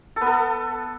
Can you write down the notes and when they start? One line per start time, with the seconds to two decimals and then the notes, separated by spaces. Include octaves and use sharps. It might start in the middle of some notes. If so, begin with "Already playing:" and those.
0.16 A4
0.21 B3
0.26 A4